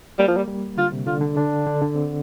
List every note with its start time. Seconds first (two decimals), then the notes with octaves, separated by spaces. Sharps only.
0.19 G3 A#3
0.28 F3
0.37 G3
0.48 G3
0.77 D3 F4
0.92 C3
1.07 D3 F4
1.21 D3
1.36 D3 D4
1.66 D3
1.81 D3
1.95 C4